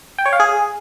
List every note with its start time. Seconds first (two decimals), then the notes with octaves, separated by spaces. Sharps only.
0.18 G5
0.26 C#5
0.33 F5
0.40 G#4